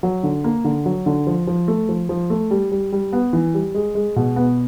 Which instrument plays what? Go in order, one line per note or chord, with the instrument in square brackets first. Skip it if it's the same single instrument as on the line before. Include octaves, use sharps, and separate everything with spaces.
[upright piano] F#3
D3
A#3
D3
F#3
D3
F3
F3
A3
F3
F3
A3
G3
G3
G3
B3
E3
G3
G#3
G#3
B2
B3